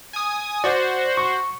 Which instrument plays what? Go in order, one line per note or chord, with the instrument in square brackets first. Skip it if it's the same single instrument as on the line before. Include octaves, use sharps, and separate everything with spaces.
[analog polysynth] G#5 D#6
[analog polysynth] F#4 C5 [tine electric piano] D5
[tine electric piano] C#6